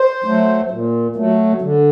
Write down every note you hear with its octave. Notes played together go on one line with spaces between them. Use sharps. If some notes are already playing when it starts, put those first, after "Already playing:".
Already playing: C5
F#3 A3
A#2
F#3 A3
D3